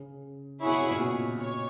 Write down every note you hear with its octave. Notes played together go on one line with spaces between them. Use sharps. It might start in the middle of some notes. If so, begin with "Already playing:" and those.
Already playing: C#3
B2 E4 G#4 C#5 F#5
C#3
B2
A#2
B2
C#5